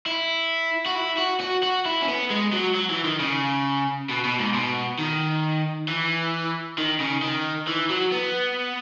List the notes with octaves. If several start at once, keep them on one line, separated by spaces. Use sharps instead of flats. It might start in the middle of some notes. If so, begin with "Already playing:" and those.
E4
F#4
E4
F#4
F#4
F#4
E4
C#4
B3
G#3
F#3
F#3
E3
D#3
C#3
B2
B2
G#2
B2
D#3
E3
D#3
C#3
D#3
E3
F#3
B3